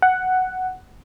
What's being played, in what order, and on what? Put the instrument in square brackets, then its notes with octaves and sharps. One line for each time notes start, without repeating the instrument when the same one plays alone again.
[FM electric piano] F#5